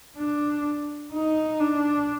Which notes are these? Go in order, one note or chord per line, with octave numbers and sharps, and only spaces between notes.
D4
D#4
D4